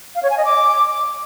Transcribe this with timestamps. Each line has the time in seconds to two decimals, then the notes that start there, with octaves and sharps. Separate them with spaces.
0.15 F5
0.23 C#5
0.30 G#5
0.38 D#5
0.45 D6